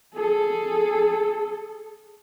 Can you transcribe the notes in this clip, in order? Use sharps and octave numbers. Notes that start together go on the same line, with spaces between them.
G#4 A4